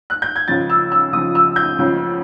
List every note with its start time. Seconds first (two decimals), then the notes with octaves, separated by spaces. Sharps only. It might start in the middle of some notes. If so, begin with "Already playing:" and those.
0.10 F#6
0.22 G6
0.36 G#6
0.48 C#2 C#3 F3 A6
0.70 E6
0.92 E6
1.12 C#2 C#3 F3 D#6
1.35 E6
1.56 G6
1.79 C#2 C#3 F3